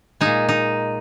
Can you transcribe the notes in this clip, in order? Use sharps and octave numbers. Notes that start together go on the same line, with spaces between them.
A#2 G#3 D#4
D#4